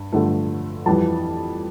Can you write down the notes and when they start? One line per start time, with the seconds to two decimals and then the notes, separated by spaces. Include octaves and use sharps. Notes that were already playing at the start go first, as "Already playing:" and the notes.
Already playing: G2
0.13 G2 D3 F3 A3
0.86 F2 E3 G3 A5